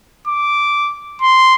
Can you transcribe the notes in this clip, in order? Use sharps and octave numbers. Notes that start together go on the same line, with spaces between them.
D6
C6